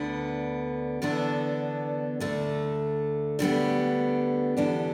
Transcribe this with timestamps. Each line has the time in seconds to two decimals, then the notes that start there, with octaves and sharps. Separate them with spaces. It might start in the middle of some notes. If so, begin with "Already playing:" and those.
Already playing: D2 D3 B3
1.02 E2 D3 B3 D4 A4
2.20 D2 D3 A3
3.39 D2 D3 G3 B3
4.57 E2 D3 B3 D4 G4